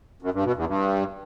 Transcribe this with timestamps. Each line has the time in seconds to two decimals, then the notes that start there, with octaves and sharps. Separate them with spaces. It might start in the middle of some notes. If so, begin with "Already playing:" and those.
0.22 F#2
0.33 G2
0.45 B2
0.56 E2
0.67 G2